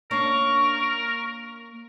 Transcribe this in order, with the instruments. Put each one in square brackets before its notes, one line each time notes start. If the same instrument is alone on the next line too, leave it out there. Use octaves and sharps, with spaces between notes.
[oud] A#3 C#4 D4 [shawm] A#4 [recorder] C#6